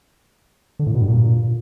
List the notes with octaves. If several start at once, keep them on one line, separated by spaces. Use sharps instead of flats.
D3
A2
B2
G2
A#2